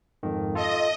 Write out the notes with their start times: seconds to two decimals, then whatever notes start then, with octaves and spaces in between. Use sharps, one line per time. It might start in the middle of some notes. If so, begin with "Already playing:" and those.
0.23 F2 G#2 D#3
0.55 F4 A4 D#5